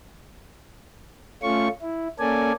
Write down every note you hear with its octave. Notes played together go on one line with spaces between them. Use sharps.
A3 C#4 F4 C#6
E4
A#3 C#4 A4 D5 G#5